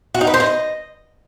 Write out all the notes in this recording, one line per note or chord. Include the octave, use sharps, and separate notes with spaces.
F#4
D#4
B4
C5
D#5